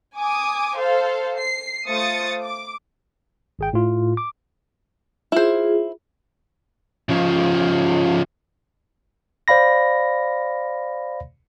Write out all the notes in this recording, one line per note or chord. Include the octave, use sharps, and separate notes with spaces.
G#5 D6 D#6
A4 C5 F5
C7
A3 F4 C5 D#6 A6 C#7
D6
G#1 G#4 G5
A2 F4
D6
E4 F4 G#4 C5
C#3 F3
C5 D5 F5 B5 A#6